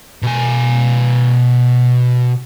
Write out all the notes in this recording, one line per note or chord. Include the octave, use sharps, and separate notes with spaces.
B2 G#5